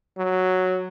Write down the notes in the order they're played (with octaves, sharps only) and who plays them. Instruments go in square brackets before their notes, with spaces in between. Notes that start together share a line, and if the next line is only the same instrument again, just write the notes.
[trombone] F#3